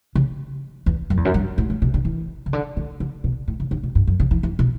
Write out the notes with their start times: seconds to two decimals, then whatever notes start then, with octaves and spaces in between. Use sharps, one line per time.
0.15 C#3
0.86 E2
1.10 F#2
1.17 E2
1.25 F#2
1.34 G2
1.58 A2
1.70 A2
1.82 B2
1.94 D3
2.05 E3
2.46 C#3
2.53 D3
2.77 D3
3.00 C#3
3.24 B2
3.48 A2
3.60 C#3
3.71 D3
3.83 B2
3.95 G2
4.07 F#2
4.20 C#3
4.31 E3
4.43 E3
4.59 B2